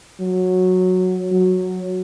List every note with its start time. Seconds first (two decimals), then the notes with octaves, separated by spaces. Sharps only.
0.20 F#3
1.31 F#3